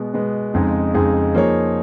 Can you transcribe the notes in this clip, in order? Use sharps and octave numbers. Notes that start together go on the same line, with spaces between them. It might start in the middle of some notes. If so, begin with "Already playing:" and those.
Already playing: B2 G#3 B3
B2 G#3 B3
F2 C#3 G#3 D#4 G#4
F2 C#3 G#3 D#4 G#4
F3 A#3 D#4 G#4 C#5